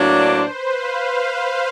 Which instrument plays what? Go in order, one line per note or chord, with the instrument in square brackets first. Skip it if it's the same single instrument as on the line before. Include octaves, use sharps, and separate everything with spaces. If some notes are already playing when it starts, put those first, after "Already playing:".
Already playing: [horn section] A2 F#3 A#3 D4
[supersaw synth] C5
B4
F5